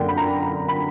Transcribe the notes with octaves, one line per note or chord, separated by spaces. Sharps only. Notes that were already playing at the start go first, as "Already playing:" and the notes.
Already playing: F#2 D3 A#3 F#5 G5
B5
A#5
A#5
B5